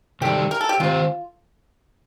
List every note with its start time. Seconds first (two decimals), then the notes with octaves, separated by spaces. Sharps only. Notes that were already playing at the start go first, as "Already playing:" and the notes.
0.21 C3 D#3 G3 D4 G4 A4
0.51 A#4
0.61 A4
0.69 G4
0.80 D#3 A3 C4 F4 G4 C5